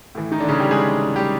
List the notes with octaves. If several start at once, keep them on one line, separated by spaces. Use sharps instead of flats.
A2 E3
D#3 D#4
D3 D4
C#3 C#4
G3 G4
G#3 G#4
G3 G4